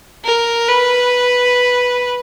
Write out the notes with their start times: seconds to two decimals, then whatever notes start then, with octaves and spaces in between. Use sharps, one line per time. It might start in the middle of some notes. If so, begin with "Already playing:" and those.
0.25 A#4
0.69 B4